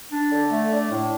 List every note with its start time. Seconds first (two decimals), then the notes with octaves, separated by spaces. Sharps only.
0.11 D4
0.31 D3
0.51 A3
0.71 D4
0.91 A2